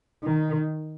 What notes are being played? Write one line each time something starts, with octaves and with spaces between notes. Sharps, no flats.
D#3